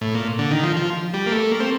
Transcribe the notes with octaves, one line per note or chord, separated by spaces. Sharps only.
A2
A#2
D3
D#3
F3
F3
G3
A#3
A3
A#3
C4